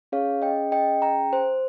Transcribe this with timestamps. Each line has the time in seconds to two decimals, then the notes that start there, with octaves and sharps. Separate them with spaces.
0.12 C#4 G#4 C#5 F5
0.42 D#5 G5
0.72 D#5 G5
1.02 G5 A#5
1.33 C5